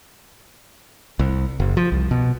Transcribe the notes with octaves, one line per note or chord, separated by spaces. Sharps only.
C2
F#1
F3
C2
B2